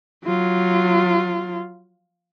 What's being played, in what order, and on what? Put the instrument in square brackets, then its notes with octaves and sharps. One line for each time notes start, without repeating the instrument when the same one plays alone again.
[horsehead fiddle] F#3 F4